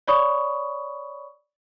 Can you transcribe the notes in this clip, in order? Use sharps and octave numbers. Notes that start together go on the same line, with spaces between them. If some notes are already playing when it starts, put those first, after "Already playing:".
C#5 D5 B5 C#6 D#6